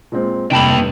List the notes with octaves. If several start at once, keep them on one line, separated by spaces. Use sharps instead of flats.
A#2 G#3 C4
F1 G2 C3 A#3 G5 A5 B5